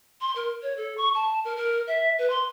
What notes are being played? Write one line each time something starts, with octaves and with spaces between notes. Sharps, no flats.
C6
A#4
C#5
A4
C#6
A5
A#4
A#4
E5
B4
C6